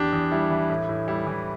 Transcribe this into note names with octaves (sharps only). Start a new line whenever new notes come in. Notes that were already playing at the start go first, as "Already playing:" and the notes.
Already playing: E2 D4 G4
E2
G3 E4
E3
A2
A2
G3 E4
E3